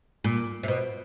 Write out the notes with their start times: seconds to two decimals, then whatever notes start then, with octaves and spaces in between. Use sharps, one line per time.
0.24 A#2
0.63 C3
0.68 B2